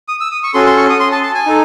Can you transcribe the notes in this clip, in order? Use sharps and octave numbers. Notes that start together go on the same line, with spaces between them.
D#6
E6
D#6
C#6
C#4 F#4 A4 C6
C6
C#6
D#6
C6
A5
A5
G#5
D#4 A4